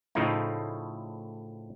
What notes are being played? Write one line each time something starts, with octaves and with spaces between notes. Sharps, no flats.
A2 C#3 F3 A3 D#4 E4